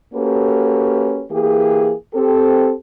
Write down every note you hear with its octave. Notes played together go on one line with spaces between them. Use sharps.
A#3 C#4 F#4 G4 A4 B4
E3 A#3 G4 G#4
C4 G4 A4